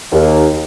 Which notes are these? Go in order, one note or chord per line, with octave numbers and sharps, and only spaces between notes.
D#2